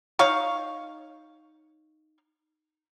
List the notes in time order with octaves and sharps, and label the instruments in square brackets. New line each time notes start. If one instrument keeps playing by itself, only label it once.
[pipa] D#4 C#5 F5